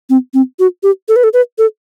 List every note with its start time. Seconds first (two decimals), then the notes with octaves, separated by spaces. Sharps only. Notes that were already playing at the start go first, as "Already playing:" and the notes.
0.10 C4
0.34 C4
0.59 F#4
0.83 G4
1.09 A4
1.16 B4
1.24 A4
1.33 B4
1.58 A4